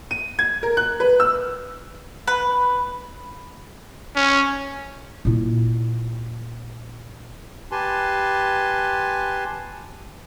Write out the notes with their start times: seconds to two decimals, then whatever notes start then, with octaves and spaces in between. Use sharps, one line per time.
0.11 D#7
0.39 G#6
0.63 A#4
0.77 F#6
1.00 B4
1.20 E6
2.28 B4
4.16 C#4
5.25 A#2 E4
7.71 G4 B4 G#5 A5 C6